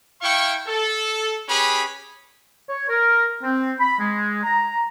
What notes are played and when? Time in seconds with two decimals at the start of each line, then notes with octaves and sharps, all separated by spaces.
0.22 E4 F5 G5 C#6
0.67 A4
1.48 C#4 G4 G#4 B4 B5
2.69 C#5
2.89 A#4
3.43 C4
3.80 B5
4.00 G#3
4.44 A#5